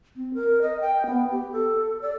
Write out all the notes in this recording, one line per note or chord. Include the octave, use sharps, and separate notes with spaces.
C4
A#4
D#5
G5
B3
G4
A4
D5